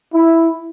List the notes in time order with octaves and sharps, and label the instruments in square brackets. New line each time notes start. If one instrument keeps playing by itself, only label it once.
[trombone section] E4